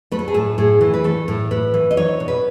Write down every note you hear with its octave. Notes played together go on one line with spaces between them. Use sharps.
A3 B4
A4
G#4
A2 A4
A2 G#4
E3
B4
A3 A4
A2
A2 B4
E3
D#5
D#4 C#5
B2
B4